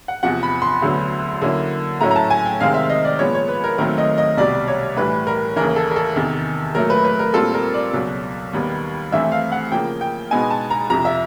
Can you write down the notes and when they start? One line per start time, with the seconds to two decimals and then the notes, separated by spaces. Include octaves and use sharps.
0.08 F#5
0.23 E2 C3 F3 F#5
0.43 B5
0.62 C6
0.82 D2 D3 F#3 B3
1.42 D3 F#3 A#3 C#4 E4
2.01 A2 F#3 A3 C#4 E4 A#5
2.11 A#5
2.16 A5
2.30 G#5
2.45 G5
2.60 C3 D#3 G#3 C4 F5
2.74 E5
2.90 D#5
3.05 D5
3.19 A#2 F3 G#3 B3 C#5
3.34 C#5
3.48 B4
3.64 A#4
3.78 D#2 D#3 F#3 A3 C4 A#4
3.98 D#5
4.18 D#5
4.37 C2 B2 G3 D5
4.68 C#5
4.97 A2 E3 G3 B4
5.27 A#4
5.56 D#2 C#3 E3 A#4
5.76 A4
5.91 A#4
5.96 A4
6.16 E2 C3 D#3
6.75 A#2 F#3 A3 A#4
6.90 B4
7.04 B4
7.19 A#4
7.34 A#2 G3 C4 F4 A4
7.54 A#4
7.74 D5
7.93 C#2 B2 F#3
8.53 D#2 D#3 G3 B3
9.12 G2 E3 A3 C4 E5
9.32 F5
9.52 F#5
9.72 C#3 F3 A#3 G5
10.01 G5
10.31 B2 G#3 B3 D#4 G#5
10.51 A5
10.70 A#5
10.90 F2 C3 F3 A#5
11.05 E5